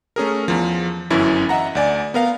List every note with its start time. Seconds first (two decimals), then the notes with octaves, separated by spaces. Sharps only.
0.16 A3 C#4 G#4 A#4
0.48 E2 F3
1.10 G1 F#2 E3 C#4 E4
1.49 D#5 E5 F#5 A#5
1.75 D2 D5 G#5
2.14 B3 A#4 F5